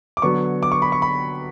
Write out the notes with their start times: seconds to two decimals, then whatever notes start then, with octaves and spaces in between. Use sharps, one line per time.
0.17 D6
0.22 D3 F#3 B3 C#6
0.63 D6
0.72 C#6
0.82 B5
0.92 C#6
1.02 B5